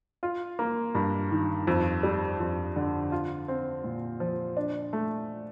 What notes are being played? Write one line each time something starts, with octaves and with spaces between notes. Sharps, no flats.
F4
A#3
G2
D#3
F2
G3
F2
D3
F4
C4
A#2
F3
D4
A3